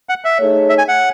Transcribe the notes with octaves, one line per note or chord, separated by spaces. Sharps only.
F#5
E5
A3 D#4 G#4 C#5
E5
G#5
F#5